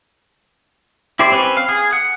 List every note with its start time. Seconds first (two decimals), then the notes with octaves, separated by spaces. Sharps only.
1.19 E4 G4 C5 D5
1.32 C4 C#4 B4
1.57 F5
1.69 G#4
1.93 F#5